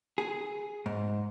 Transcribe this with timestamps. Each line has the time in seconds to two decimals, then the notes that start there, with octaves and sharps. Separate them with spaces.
0.18 G#4
0.86 G#2